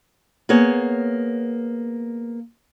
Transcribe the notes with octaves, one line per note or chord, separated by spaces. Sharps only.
A#3 B3 G#4 C#5